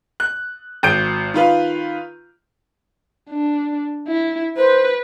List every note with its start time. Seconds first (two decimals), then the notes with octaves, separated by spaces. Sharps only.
0.20 F#6
0.83 G#1 G6 D7
1.34 D#3 F4 B4 F5
3.31 D4
4.08 E4
4.57 B4 C5